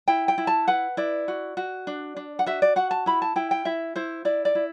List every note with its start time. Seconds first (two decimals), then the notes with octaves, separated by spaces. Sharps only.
0.08 E4 G5
0.28 G5
0.38 E4
0.47 A5
0.68 B4 F#5
0.97 E4 D5
1.28 F#4
1.57 F#4
1.87 D4
2.16 D4
2.39 F#5
2.46 F#4 E5
2.62 D5
2.76 F#4 F#5
2.91 A5
3.06 E4 B5
3.22 A5
3.36 E4 G5
3.51 G5
3.65 E4 E5
3.96 E4 C5
4.25 E4 D5
4.45 D5
4.55 E4